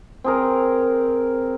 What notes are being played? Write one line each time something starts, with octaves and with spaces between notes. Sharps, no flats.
C4 G#4 A#4